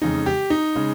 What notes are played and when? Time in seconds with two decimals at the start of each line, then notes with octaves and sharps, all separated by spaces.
0.02 F2 C#3 G#3 D#4
0.26 G4
0.50 D#4
0.76 C#3 G#3